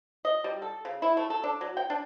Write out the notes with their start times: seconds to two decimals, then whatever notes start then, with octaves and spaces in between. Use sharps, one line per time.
0.25 D#5
0.44 G3
0.62 A4
0.85 C#3
1.02 E4
1.17 A3
1.30 A4
1.44 D4
1.61 F#3
1.77 G5
1.90 D4